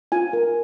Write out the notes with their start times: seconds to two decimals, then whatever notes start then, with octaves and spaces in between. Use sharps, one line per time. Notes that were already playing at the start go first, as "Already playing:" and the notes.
0.12 F4 G#5
0.33 A#4